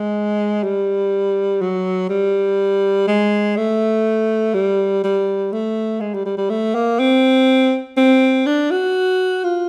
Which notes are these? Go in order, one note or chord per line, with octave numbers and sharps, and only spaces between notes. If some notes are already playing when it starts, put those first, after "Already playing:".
Already playing: G#3
G3
F#3
G3
G#3
A3
G3
G3
A3
G#3
G3
G3
G3
A3
A#3
C4
C4
D4
F#4
F4